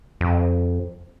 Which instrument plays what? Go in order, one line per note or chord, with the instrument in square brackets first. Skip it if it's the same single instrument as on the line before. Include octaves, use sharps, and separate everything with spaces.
[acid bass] F2